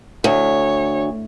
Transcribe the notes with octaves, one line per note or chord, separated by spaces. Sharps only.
D2 C#5